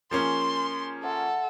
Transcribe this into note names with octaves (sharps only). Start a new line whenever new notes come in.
F3 A#3 C#4 G#4 G#5 C6
A4 E5 F#5 C6